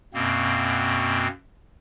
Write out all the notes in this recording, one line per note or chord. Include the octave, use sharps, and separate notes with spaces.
F#2 B2 A#3 C4